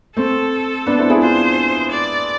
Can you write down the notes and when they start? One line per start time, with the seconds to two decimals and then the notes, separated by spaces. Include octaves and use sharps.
0.16 A3 C4 A4
0.86 B3 D4
0.98 C4 E4
1.10 E4 G#4
1.21 D4 F4 C5
1.91 D5